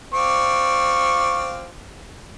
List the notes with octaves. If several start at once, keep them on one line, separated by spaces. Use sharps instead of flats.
C4 F4 D5 C#6